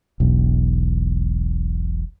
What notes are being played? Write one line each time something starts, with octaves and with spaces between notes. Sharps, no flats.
E1 B1